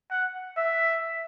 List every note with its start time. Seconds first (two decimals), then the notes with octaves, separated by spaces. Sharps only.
0.11 F#5
0.57 E5